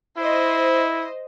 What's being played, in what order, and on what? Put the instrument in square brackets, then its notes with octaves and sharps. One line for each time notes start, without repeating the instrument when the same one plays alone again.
[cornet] E4 [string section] C5 D#5